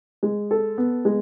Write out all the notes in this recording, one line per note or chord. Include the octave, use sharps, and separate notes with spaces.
G#3
A4
B3
G#3